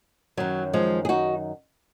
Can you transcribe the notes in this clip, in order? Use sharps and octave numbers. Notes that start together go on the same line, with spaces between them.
F#2 D#3 F#3
F3 G#3
G#4
D#4 F#4